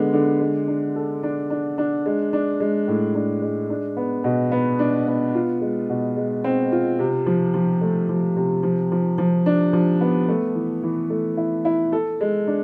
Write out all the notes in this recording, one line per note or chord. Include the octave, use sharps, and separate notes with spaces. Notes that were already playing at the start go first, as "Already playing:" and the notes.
Already playing: D3 G#3 B3
D3
G#3
D4
A4
D4
D4
D4
G#3
D4
G#3
A2
D4
G#3
D4
B3
B2
B3
D4
B3
F4
G#3
B2
G#3
C4
F4
C3
F3
F3
A3
F3
C3
F3
F3
F3
D4
F3
B3
A3
E3
E3
A3
E4
E4
A4
G#3
D4